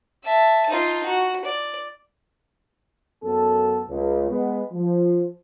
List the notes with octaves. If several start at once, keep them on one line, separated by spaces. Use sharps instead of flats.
E5 A5
D#4 F4
F#4
D5
F#2 B3 A4
C#2
G#3 B3
F3